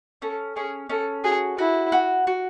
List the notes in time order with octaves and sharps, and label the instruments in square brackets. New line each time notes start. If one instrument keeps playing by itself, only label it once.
[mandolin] C#4 [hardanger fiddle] A4
[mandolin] C#4 [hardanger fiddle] G#4
[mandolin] C#4 [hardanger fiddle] A4
[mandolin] F#4 [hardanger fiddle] G#4
[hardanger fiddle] E4 [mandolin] F#4
[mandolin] F#4
F#4